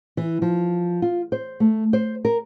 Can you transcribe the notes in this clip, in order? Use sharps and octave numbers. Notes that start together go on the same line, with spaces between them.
E3
F3
F4
C5
A3
C5
A#4